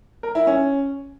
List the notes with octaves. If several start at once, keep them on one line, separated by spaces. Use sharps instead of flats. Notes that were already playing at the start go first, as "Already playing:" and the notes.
A#4
E4
C#4